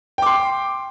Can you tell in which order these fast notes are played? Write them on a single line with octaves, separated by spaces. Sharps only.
G5 D6 C6